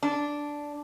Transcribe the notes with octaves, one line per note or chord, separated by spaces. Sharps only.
D4